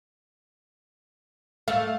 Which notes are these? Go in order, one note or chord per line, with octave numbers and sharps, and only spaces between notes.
A3 F5